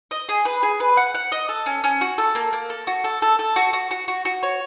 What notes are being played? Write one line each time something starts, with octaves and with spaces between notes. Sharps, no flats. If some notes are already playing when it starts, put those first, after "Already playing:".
D#5
G#4
B4
G#4
B4
F#5
F#5
D#5
A4
C#4
C#4
F#4
A4
A#3
A#3
A4
F#4
A4
A4
A4
F#4
F#4
F#4
F#4
F#4
C#5